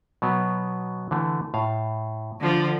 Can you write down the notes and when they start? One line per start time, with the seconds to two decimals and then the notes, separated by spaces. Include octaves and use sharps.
0.22 B2 F#3 B3
1.11 D3 E3 A3
1.54 A2 F5
2.40 D3 F3